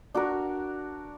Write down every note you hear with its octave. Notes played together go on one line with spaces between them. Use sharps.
D4 F#4 A#4